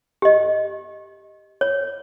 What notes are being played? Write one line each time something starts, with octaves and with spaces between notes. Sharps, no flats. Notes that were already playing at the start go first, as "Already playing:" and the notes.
G4 D#5
C#5